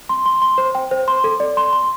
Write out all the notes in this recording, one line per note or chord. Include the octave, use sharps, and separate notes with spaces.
C6
C6
C6
C5
G5
C5
C6
A4
D5
C6
C6